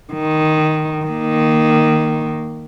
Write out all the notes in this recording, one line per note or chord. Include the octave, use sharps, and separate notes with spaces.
D#3
D#3 A#3